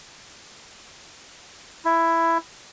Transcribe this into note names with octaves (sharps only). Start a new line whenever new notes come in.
E4